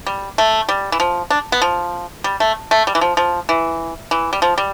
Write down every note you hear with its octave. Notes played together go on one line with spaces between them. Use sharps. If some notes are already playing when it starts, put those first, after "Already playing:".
G3
A3
G3
E3
F3
D4
B3
F3
G3
A3
A3
G3
E3
F3
F3
E3
E3
G3
F3
G3